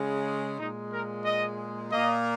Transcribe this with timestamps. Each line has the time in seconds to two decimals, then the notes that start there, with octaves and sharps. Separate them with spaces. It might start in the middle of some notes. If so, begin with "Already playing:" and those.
Already playing: C#3 G#3
0.59 A#2 G#3 D#4
0.93 A#4
1.25 D#5
1.92 A#2 A#3 D#5